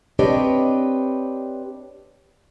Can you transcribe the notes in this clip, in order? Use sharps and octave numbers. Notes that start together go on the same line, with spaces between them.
C4 D4 G4 B4 C#5 D#5